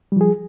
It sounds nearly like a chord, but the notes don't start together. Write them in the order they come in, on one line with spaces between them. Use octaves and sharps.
G3 F3 G#4